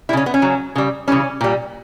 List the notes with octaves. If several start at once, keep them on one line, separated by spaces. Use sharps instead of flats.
G3 E4
C#3 C#4
B3
C#4
C#3 F#3
C#3 G3
C#3 E3 G3 C#4
A#2 G3